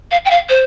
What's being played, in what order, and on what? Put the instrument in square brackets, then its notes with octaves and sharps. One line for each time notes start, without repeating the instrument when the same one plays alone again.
[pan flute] F5
G5
F5
C5